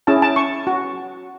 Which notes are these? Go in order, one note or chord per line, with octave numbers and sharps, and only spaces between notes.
C#4 E4 G#4 A5
A5
C#6
F#4